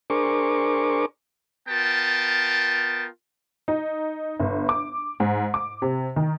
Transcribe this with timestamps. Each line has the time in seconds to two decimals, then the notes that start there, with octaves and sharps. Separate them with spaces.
0.10 D4 G#4 A#4 C5 C#6 D6
1.69 B3 F4 A#4 G5 A5
3.68 D#4
4.40 G1
4.69 D6
5.20 G#2
5.54 D6
5.82 C3
6.16 D#3